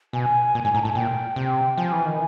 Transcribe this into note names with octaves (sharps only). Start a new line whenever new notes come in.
B2 G#5
A#2
G#2
A2 A#5
A5
A2
G#5
A#2 G5
C3
F3 G#5
E3
D#3